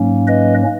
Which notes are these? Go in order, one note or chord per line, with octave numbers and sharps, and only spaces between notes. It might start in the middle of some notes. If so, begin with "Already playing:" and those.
Already playing: G#2 F#3 A#3 C#4
B4 D#5